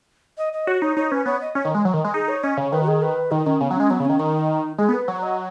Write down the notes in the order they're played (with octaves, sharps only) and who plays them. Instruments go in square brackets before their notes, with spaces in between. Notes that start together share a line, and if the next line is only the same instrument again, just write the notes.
[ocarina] D#5
D#5
[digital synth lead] F#4 [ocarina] C#5
[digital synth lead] D#4 [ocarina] C#5
[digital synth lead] D#4 [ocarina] C#5
[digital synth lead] C#4 [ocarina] B4
[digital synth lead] B3 [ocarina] C#5
[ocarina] D#5
[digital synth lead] C#4 [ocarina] C#5
[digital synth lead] D#3
G#3
F#3
D#3
G#3
[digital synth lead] D#4 [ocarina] G#4
[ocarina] C#5
[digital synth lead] C#4 [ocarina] D#5
[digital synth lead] C#3 [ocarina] C#5
[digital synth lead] D#3 [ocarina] B4
[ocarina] F#4
G#4
B4
[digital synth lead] D#3 [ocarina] D#4
[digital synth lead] D#3 [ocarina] C#4
[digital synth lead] C#3 [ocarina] B3
[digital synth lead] F#3
[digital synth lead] G#3 [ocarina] C#4
[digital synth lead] F#3 [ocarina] B3
[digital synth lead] C#3
[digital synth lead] D#3 [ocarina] C#4
[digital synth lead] D#3 [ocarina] D#4
[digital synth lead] G#3 [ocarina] G#4
[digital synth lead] B3
[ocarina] B4
[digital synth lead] F#3 [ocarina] C#5
[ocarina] D#5